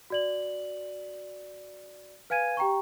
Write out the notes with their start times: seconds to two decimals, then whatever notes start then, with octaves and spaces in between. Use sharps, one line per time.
0.10 F#4 D5 F#7
2.30 B4 F5 G#5 G#6 D#7
2.57 G4 G5 A#5 C#6